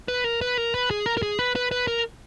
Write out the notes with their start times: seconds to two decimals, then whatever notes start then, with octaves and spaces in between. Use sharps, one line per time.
0.08 B4
0.24 A#4
0.41 B4
0.57 A#4
0.74 B4
0.91 G#4
1.06 A#4
1.17 A#4
1.22 G#4
1.39 B4
1.56 B4
1.71 B4
1.87 A#4